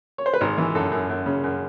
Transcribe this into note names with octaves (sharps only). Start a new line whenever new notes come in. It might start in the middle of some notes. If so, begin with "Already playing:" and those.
C#5
C5
B4
G#1 A#4
E3
F#2 A4
F#2
F#2
C#3
F#2